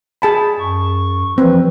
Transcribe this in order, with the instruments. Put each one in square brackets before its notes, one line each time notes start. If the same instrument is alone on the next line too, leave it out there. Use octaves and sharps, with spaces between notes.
[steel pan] G#4 A5 B5
[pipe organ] F#2 C#6
[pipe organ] E3 F3 B4 [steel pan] C4